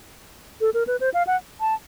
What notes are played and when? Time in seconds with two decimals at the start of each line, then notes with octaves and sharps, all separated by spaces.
0.61 A4
0.74 A#4
0.87 B4
1.00 C5
1.14 F5
1.27 F#5
1.61 A5